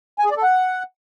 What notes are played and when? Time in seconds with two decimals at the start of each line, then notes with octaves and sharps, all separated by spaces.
0.19 G#5
0.25 G#4
0.31 D5
0.37 A4
0.43 F#5